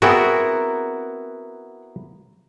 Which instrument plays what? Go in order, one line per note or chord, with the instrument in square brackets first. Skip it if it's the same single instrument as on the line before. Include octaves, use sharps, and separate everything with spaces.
[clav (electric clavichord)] B3 E4 F#4 [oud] C4 G#4 [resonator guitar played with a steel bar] A#4